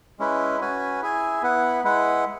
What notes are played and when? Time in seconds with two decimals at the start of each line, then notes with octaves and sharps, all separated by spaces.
0.19 G#3 C#4 E4 B4
0.60 C#4 F#4 B4 G#5
1.02 E4 G#4 E5 G#5
1.42 B3 E4 B4 F#5
1.84 G#3 E4 B4 F#5